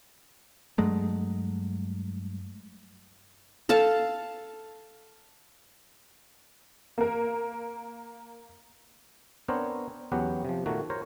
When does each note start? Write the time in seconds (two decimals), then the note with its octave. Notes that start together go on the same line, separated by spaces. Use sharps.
0.78 G2 F#3 G#3 A3
3.69 A4 F5 A5
6.98 A#3 A#4
9.48 B3 C4 D4 A#4 C5 C#5
10.12 E2 F#3 B3 C#4 G4 F#5
10.45 C3 F3
10.66 A#2 D#3 A3 A#3 F#4
10.90 A#4 C5 C#5 A#5